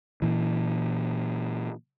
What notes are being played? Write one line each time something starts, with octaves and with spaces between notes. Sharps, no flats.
A#2 E3